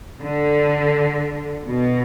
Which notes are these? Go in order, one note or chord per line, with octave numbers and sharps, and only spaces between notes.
D3
B2